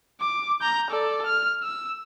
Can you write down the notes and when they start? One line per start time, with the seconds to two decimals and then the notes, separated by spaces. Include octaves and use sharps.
0.21 D6
0.61 A#5 G6
0.90 A4 D5
1.26 F6
1.63 E6